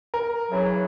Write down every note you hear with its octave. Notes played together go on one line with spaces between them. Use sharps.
A#4
C#3 E3 F#3